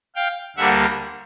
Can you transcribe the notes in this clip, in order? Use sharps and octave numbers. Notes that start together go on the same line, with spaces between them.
F5 G5
D2 D3 G3 A#3 E5 F#5